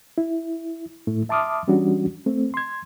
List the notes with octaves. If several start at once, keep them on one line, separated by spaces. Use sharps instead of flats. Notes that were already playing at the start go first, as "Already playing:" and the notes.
E4
A2 A3 E4
E5 A5 C6 D6 D#6 F6
E3 G3 C#4 D4 F#4
A3 C4
C6 G#6